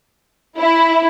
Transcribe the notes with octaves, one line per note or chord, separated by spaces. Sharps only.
E4